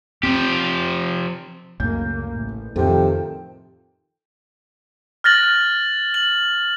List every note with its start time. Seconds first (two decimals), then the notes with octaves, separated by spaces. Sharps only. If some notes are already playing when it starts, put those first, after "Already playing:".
0.23 F3 C4 G4
1.80 C#2 F#2 A2 C#3 A#3 G6
2.30 A1
2.76 F2 A2 C3 D#3 F3 A4 G5
5.24 F6 F#6 A6 A#6 F#7
6.14 F#7